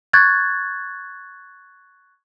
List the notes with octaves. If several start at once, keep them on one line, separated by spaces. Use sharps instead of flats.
C#6 F#6 G#6 A6